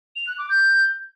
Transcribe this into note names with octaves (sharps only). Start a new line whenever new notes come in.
F7
F#6
D6
G6